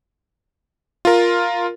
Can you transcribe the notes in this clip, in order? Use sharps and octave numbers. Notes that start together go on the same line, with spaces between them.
F4 A#4